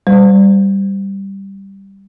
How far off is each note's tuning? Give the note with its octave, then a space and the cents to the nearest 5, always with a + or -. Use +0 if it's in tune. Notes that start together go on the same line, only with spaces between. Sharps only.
G3 +0 C5 -35